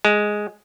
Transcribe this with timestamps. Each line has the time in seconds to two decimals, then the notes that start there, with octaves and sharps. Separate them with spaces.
0.05 G#3